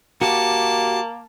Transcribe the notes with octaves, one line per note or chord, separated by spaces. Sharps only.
A#3 F#4 G4 A5